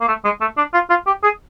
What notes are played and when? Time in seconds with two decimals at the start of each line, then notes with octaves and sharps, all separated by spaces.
0.01 A#3
0.08 A3
0.24 G#3
0.41 A3
0.57 D4
0.73 F4
0.90 F4
1.06 G4
1.23 G#4